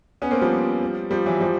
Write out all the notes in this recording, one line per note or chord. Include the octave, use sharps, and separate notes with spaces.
B3 C#4
A#3 C4
F3 G3
F3 G3
E3 F#3
F3 G3